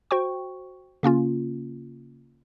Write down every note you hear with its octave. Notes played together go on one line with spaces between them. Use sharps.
F#4 C5 G5 C#6
C#3 A#3 C#4 F4